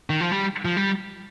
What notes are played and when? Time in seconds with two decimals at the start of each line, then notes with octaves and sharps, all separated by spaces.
0.10 D#3
0.21 F3
0.32 G3
0.65 F3
0.77 G3